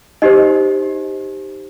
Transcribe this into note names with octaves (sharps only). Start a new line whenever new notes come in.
D#4 G4 C5 D#5